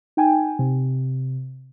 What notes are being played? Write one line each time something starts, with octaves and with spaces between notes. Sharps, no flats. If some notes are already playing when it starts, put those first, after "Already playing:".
D#4 G5 G#5
C3